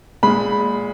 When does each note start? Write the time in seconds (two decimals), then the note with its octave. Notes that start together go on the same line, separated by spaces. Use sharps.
0.23 A#2 G#3 B5